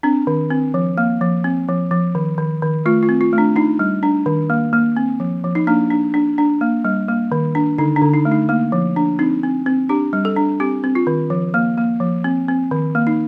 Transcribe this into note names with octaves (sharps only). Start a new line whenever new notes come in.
C4 D4
D#3
C4
F3
A#3
F3
C4
F3
F3
D#3
D#3
D#3
A3 F4
F4
C4
F4
A3
D4
D4 D#4
G3
D4
D#3
A#3
A#3
C4
F3
F3
D#4
A#3 D4
D4
D4
D4
A#3
G3
A#3
D#3
D4
D3 D#4
D4
D3
D#4
A3
D#4
A#3
F3
D4
C4 D#4
C4
C4
D4 G4
G3
A4
D4
C4 G4
C4
F4
D#3
F3
A#3
A#3
F3
C4
C4
D#3
A#3
D#4